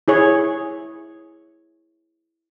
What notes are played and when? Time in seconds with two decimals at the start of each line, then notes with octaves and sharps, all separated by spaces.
0.08 E4 G#4 C#5